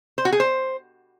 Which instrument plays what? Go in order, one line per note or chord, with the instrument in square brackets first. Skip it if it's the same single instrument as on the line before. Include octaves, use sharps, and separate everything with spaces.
[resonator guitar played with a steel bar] C5
F#4
G#4
C5